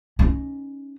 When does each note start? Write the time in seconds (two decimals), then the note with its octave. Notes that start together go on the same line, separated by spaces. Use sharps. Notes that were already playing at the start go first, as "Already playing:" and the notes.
0.19 C#4 D#4